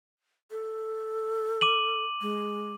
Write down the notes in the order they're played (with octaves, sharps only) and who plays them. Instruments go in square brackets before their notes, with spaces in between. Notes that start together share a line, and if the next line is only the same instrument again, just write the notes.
[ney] A4
[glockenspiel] D6 D#7 F#7
[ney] G#3